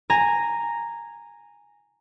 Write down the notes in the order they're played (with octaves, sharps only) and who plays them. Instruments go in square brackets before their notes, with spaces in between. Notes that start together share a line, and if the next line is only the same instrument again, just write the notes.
[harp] G#5 A#5